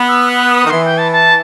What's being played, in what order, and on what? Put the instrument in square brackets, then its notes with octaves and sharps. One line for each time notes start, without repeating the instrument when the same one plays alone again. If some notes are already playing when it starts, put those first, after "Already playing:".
Already playing: [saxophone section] B3
[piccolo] E6
F#6
D#6
[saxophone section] D#3
[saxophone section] E3 [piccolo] C6
[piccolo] G5
A5
A5